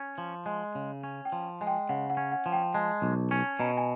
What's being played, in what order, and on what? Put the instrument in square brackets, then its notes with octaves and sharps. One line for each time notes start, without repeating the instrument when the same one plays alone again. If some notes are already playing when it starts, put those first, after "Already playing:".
Already playing: [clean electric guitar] C#4
F3
G#3
C#3
C#4
[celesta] G5
[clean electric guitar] F3
[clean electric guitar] G#3 [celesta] G#5
[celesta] G5
[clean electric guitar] C#3 [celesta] F#5
[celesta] F#5
[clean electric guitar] C#4
[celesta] F#5
[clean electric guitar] F3
[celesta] G5
[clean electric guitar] G#3 [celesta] A5
[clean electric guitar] B1
C#4
[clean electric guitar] B2 [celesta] A#5
[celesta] G#5